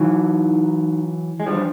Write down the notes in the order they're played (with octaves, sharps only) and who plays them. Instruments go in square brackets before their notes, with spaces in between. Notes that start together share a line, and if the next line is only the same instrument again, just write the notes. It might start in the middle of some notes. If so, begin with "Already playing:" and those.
Already playing: [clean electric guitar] E3 F#3 [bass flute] D#4
[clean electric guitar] G#3
[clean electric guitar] F3 G3 [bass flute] D4